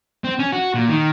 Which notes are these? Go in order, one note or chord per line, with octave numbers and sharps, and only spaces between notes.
C4
C#4
F#4
A#2
D#3